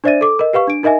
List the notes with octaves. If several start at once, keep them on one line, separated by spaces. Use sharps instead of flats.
D4 C5 D5 E5 A6 D#7
A4 D6
A#4 D#5
G4 B4 F5 C#6
D4 D7
D#4 A#4 D#5 E5 G#5